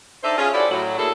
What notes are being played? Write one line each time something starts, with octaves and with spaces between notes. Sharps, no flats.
D4 D#4 A4 C5 D5 E5
C#4 F4 G#4
E4 F#4 G4 A4 C5 D5
A2 F#3
A#3 E4 G#4 A4